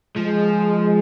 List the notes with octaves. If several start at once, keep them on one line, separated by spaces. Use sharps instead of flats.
F3 G#3